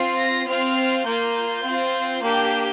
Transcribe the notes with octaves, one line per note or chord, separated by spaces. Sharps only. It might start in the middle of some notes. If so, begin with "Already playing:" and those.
Already playing: C4 F4
A#6
C4 F4 F6
A#3 F4 G6
C4 F4
A#3 D4 G4 G6